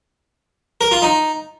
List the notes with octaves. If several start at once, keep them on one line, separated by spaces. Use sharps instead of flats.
A#4
F4
D#4